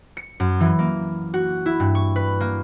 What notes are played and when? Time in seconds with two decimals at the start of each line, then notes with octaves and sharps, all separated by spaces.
0.17 C#7
0.40 F#2
0.60 E3
0.79 A#3
1.34 F#4
1.66 E4
1.80 G2
1.95 C#6
2.16 B4
2.40 A#3